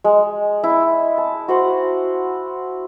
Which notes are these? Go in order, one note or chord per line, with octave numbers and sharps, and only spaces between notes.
G#3
E4
A5
F#4 C5 F#5